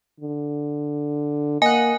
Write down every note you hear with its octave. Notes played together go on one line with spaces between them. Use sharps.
D3
A#3 D#5 F#5 G#5